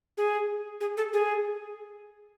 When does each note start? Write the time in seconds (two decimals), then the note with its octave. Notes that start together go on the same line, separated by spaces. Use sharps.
0.17 G#4
0.81 G#4
0.97 A4
1.13 G#4